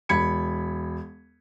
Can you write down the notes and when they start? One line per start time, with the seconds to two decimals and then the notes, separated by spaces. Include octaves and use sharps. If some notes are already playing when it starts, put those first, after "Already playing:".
0.09 E1 B5 G#6 C#7